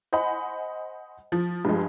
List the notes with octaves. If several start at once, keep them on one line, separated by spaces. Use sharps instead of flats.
C5 D#5 F#5 G#5 B5
F3
G2 F3 G#3